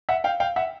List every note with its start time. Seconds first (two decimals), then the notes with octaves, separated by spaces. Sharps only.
0.09 E5 F#5
0.24 F5 G5
0.40 F5 G5
0.56 E5 F#5